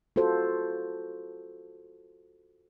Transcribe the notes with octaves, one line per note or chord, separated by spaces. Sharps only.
F4 F#4 A4 C5